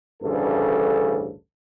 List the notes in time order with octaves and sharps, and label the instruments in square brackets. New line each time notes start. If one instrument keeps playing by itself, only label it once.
[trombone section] A1 D2 G2 C#3 A4